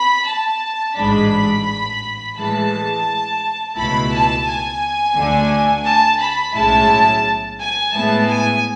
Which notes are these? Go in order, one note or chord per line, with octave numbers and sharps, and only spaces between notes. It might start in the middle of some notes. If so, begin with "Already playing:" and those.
Already playing: B5
A5
A1 G#2 G#3 D4 B5
A2 E3 G#3 A5
C#2 B2 A3 E4 B5
A5
G#5
D2 D3 A3 D4
A5
B5
B1 A2 G#3 C#4 E4 A5
G#5
A2 G#3 B3 E4 A5
G#5